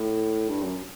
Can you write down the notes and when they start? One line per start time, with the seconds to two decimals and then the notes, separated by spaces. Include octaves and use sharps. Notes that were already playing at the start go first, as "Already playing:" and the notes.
Already playing: A2
0.49 G2
0.62 F#2